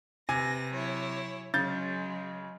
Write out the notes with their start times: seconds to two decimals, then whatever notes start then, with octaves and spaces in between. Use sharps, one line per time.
0.29 C3 B4 G#5 A#6
0.73 F#3 E4 C#5
1.54 C#3 F#3 G#3 G6 A6